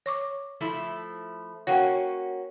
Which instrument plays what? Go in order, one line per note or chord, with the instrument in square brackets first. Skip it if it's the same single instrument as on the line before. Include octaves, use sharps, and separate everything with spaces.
[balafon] C#5 C#6 D6
[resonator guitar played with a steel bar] F3 A3 E4
[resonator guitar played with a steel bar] A#3 C#4 F#4 [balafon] C#5 F#5 G5